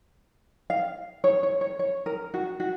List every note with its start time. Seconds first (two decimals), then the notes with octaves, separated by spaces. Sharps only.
0.70 F5
1.24 C#5
1.43 C#5
1.61 C#5
1.79 C#5
2.06 A#4
2.34 F#4
2.60 F#4